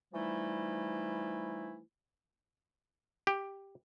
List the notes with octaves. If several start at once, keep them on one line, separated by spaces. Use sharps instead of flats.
E3 F3 G3 A3 D#4 E4
G4